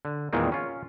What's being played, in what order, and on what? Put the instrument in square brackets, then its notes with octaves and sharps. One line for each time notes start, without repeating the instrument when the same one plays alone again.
[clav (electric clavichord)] D3
E2 A#2 D#3 G#3 C4
C#4 F4